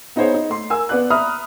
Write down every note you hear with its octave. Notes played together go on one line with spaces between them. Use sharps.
B3 D#4 G#4 C5 C#5
D#4
A3 C6
A#4 G#5 E6
B3 B4 D5 F#6
E5 A#5 B5 D#6 F6